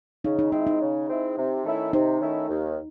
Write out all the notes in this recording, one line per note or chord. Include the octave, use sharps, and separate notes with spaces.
C#3 D#4
D#4
G#3 C4 D#4 E4
D#4
C#3
G#3 C4 E4
C3
D#3 A3 C#4 E4
C3 D#4
D#3 A3 C#4 E4
D#2